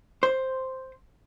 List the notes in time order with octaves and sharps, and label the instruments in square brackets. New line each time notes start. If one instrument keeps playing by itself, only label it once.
[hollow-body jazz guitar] C5